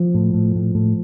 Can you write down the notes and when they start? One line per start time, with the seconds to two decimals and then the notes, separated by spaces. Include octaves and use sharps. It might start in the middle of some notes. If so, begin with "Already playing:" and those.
Already playing: F3
0.14 A2
0.34 A2
0.55 A2
0.75 A2